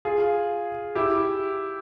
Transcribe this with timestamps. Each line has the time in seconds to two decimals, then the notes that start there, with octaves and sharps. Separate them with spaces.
0.05 F4 G#4
0.95 E4 G4